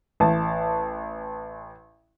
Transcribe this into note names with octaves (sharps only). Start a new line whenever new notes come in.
A1 A5